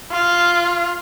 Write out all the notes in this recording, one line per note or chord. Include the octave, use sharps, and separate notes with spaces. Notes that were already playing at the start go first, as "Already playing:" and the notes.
F4